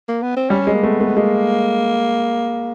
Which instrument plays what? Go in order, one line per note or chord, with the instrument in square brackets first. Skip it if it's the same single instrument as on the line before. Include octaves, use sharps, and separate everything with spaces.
[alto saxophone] A#3
B3
C4
[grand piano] G3 [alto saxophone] C#4
[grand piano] G#3
[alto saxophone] A#3
[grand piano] A3 [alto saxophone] B3
[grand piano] A3
[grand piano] G#3 [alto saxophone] A#3